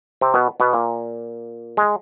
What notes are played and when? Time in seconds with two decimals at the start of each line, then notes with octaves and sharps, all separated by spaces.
0.21 C3 C4
0.34 B2 B3
0.60 B2 B3
0.73 A#2 A#3
1.77 G#3